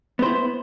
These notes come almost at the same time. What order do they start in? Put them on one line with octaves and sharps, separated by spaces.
B3 C5 E4